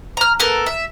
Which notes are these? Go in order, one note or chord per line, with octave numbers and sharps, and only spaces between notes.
A#5 F6
B3 A4 A#4
E5